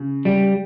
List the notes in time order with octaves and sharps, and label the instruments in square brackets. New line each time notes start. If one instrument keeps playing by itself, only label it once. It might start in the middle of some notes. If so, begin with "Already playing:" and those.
Already playing: [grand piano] C#3
[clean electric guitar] G3